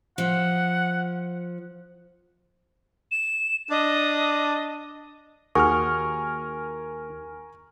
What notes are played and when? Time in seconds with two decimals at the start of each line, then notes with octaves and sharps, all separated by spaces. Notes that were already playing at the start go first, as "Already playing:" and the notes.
0.18 F3 F#5
3.11 E7
3.70 D4 D#5
5.55 D#2 F#4 G#4 A#4 G#5 C#6 F6